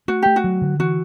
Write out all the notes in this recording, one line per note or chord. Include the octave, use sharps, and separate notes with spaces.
A3 F#4
A3 G4
F#4
F#3
D3
E3 F#4